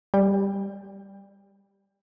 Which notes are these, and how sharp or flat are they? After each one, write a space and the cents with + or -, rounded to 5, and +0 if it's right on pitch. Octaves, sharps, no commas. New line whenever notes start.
G3 +10 G5 +30